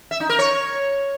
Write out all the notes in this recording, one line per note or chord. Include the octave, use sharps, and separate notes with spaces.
E5
D#4
A#4
C#5